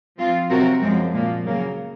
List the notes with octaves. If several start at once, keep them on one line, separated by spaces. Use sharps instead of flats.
F3 C4 F4
C3 F#3 C4 F#4 A#4
F#2 F3 G#3 C4
A#2 F3 A#3
C#3 F#3 A#3